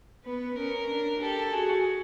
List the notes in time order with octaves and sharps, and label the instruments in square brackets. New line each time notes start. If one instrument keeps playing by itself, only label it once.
[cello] B3 [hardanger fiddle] B4
[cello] C#4 [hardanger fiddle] A#4
[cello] D4
[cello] G4 [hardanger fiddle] A4
[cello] F#4 [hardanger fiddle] G#4